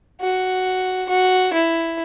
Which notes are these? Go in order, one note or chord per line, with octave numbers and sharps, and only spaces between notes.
F#4
F#4
E4